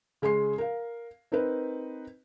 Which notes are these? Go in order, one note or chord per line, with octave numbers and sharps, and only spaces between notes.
C#3 G#3 G#4 C6 C7
A#4 F5
C4 D#4 A#4 B4